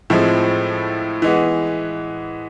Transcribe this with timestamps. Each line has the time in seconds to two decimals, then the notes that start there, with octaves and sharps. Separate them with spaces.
0.10 A2 F3 G#3 C4 E4
1.22 E3 G#3 B3